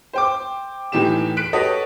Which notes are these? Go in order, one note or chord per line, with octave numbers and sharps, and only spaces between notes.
C5 G5 D6
A2 E3 D#4 G4 E7
F#6 B6 D7
F#4 G4 A4 B4 C#5 D#5